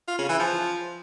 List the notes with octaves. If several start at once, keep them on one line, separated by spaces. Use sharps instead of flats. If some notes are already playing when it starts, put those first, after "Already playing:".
F4
C#3
E3
F3